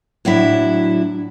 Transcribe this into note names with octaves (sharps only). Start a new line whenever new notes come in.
A2 F#3 D4 E4